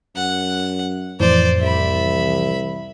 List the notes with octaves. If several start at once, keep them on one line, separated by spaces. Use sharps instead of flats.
F#2 F#5
F2 A2 E3 C5 D5
C2 E5 B5